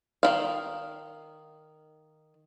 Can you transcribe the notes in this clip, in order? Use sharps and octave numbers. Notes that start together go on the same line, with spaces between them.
D#3 E4 F5